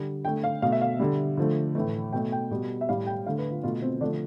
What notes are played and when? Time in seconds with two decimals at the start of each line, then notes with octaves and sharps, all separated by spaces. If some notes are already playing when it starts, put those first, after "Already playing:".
Already playing: D3 G3
0.25 D3 A3 G5
0.44 F5
0.62 B2 A3 F5
0.72 E5
0.82 F5
0.99 D3 G3
1.37 D3 F3 A3
1.75 A2 E3 A3
2.13 B2 A3 G5
2.32 G5
2.51 B2 G3
2.81 E5
2.88 A2 G3 F5
3.07 G5
3.26 D3 A3 F5
3.38 B4
3.51 F4
3.63 B2 A3 F4
3.82 C4
4.01 D3 F3 A3 D4